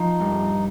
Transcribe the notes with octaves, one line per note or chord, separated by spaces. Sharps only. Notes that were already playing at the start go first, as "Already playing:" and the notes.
Already playing: F3 D#4
G2